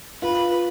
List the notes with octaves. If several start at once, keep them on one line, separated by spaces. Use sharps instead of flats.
F4 B4